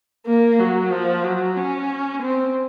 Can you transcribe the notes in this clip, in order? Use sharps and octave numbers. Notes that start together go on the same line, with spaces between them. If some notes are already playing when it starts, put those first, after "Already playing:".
A#3
F#3
F3
F#3
C#4
C4